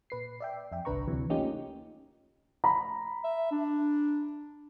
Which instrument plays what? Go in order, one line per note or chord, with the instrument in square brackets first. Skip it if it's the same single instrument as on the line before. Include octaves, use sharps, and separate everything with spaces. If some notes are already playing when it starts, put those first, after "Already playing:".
[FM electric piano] A#2 B4 C7
D5 E5 G5
F2 E5 G5
G1 C2 D4 B4 A#5 C#6
D2 C3 E3 F#3
A3 A#3 C#4 D#4 F4 G4
[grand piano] A#5 B5
[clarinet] E5
D4